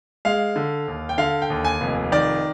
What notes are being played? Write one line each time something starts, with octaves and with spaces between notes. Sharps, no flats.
G#3 F5
D3
D#2
G5
D3 F5
G5
D#2
G#5
F1
D#3 D5